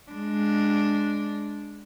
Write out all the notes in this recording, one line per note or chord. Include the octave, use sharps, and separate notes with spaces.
G#3 D4